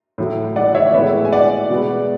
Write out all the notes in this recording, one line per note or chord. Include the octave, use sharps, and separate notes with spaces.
A2 F#3 A3
D5 F#5
C#5 E5
A2 G#3 B3 C#5 E5
G#5
D5 F#5
B2 G#3 B3